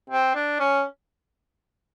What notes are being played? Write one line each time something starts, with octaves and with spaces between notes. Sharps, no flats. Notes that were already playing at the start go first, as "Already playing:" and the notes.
C4
D4
C#4